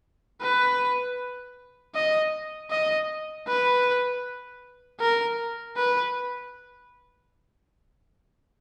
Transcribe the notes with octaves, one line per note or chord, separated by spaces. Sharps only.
B4
D#5
D#5
B4
A#4
B4